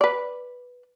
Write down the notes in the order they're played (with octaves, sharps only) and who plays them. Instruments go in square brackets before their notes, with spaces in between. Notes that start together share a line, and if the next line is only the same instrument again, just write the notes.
[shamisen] B4 D5